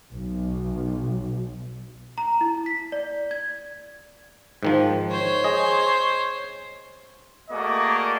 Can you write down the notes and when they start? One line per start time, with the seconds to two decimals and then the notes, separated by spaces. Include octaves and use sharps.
0.11 B1
2.18 A#5
2.41 E4
2.66 B6
2.92 D5
3.31 G#6
4.63 G#2 D#3 F3
5.10 C5 C#5
5.44 G#4 D#5
7.50 A3 A#3 F#4 G#4 D5 D#5